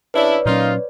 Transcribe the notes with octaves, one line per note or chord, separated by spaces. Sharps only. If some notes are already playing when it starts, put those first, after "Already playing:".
C#3 D4 E4 B4 C#5 D5
A#2 F#3 A#3 C#4 D#4 F4